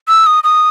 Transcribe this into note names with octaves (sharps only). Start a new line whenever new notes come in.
E6
D#6
D#6